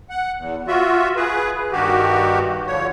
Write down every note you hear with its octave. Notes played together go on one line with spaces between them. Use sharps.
F#5
E2
F4 F#4 E5
G#4 B4
G2 D#3 F#4 G4
D3 F3 C#5